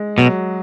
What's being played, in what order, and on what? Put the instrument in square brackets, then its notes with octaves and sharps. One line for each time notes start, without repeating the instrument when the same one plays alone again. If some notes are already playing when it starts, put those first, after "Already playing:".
Already playing: [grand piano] G#3
[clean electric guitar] B2 [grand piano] F#3